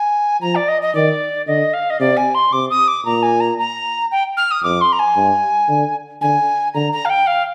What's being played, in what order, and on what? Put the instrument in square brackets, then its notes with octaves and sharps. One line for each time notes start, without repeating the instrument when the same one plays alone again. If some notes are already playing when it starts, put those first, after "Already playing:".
Already playing: [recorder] G#5
[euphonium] F3 [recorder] A#5
[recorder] D5
D#5
D#5
[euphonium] D#3 [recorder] D5
[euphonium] D3 [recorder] D#5
[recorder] F5
D#5
[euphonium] C3 [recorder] D5
[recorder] G#5
C6
[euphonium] C3 [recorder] D6
[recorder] D#6
D6
[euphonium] A#2 [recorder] A#5
[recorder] G#5
A#5
A#5
G5
F6
D#6
[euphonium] F2 [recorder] D6
[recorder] C6
A#5
G#5
[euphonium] G2
D3
[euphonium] D3 [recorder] G#5
[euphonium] D3 [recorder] A#5
[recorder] A#5
F5
G5
F5